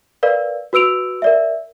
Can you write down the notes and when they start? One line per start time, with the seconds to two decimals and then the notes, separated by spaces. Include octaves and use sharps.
0.23 A#4 B4 D5 F5
0.73 F#4 B4 E6 D7 F7
1.22 A#4 D5 E5